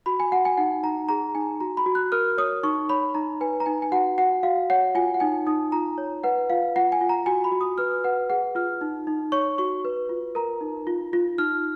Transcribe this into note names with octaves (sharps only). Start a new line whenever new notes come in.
F#4 B5
G#5
F#4 F#5
G#5
D#4 F#5
D#4 A#5
G#4 A#5
D#4 G#5
F#4 A#5
B5
F#4
F#6
A#4 F6
C#5 D#6
D#4 C#6
C#5 B5
D#4 A#5
B4 G#5
A#5
D#4 G#5
G#5
F#4 F#5
F#4 F#5
F#4 F5
C#5 F#5
F4 G#5
F#5
D#4 G#5
D#4 D#6
F4 A#5
C#5
B4 F#5
F4 F5
F4 F#5
G#5
F4
A#5
F#4 G#5
B5
F#4
D#6
B4 F6
B4 F#5
G#4 F#5
F4 F6
D#4
D#4
C#5 C#6
F#4 C#6
B4
F4
A#4 A#5
D#4
F4
F4
D#4 F6